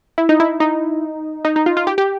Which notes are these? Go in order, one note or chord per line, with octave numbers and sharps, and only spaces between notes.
E4
D#4
E4
D#4
D#4
D#4
F4
F4
G4
G4